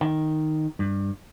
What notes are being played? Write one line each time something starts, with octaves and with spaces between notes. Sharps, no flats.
D#3
G2